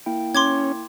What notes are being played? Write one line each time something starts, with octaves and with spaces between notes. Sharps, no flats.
A#3 E4 G5
C#4 C6 D6 G#6